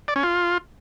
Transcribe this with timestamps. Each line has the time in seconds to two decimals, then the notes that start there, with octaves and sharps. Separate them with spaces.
0.08 D5
0.16 C#4
0.23 F4